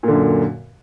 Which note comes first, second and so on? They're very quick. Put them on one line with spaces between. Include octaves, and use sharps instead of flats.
A#2 D3 F#2